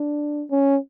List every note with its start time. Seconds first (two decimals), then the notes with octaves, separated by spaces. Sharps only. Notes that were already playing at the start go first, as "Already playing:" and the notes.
Already playing: D4
0.50 C#4